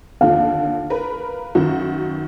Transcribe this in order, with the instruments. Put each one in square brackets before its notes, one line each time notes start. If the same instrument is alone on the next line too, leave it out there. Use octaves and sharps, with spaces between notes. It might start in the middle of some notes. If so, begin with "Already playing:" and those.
[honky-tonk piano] D#2 D3 F3 [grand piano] F5
[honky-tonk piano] A#4 B4
F#2 D#3 F#4